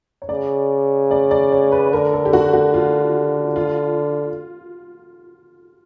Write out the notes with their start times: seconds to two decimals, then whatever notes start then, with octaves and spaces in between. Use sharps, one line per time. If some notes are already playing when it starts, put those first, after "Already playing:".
0.22 C#5
0.29 C#3 D5
1.11 D5
1.31 D5
1.52 C#5
1.72 B4
1.92 D3 A#4
2.13 A4
2.25 G4
2.33 F#4
2.53 F#4
2.74 F4
3.56 F4